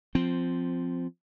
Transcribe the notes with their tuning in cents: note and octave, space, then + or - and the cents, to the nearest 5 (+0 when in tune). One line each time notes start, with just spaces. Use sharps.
F3 +0 C4 -10